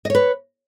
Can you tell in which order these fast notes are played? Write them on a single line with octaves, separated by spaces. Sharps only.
D#5 C#5 B4